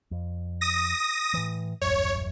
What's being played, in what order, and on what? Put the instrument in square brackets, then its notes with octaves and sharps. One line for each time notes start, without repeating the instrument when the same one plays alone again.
[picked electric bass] F2
[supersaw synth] D#6 A#6
[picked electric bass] A2 E3
[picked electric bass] D#1 A1 F#2 [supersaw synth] C#5